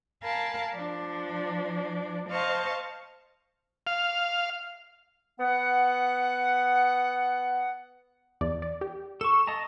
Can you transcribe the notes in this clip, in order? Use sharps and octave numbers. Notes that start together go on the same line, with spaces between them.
A#4 F5 G#5 A5 B5
F3 D4
C5 D#5 F5 A5 C#6
F5
B3 F#5
E2 D5
D5
G4
A4 C#6 E7
D#5 A5 A#5